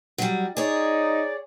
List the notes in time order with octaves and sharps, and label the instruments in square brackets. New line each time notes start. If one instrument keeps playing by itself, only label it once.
[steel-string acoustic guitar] F#3 G3
[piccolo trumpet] D#4 [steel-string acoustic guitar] G#4 C#5 [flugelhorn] D5